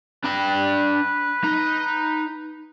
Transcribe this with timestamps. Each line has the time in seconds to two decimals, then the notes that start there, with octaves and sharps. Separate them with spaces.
0.24 D4 B4 G5
1.44 D#4